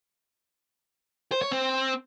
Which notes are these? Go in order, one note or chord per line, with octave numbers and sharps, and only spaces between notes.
C5
C#5
C4